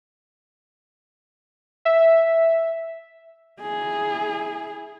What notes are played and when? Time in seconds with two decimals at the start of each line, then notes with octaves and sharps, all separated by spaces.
1.85 E5
3.61 E4 G#4